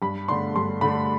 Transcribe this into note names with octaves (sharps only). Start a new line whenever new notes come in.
G2 B5
D3 A3 D4 C6
G2 C6
D3 A3 D4 B5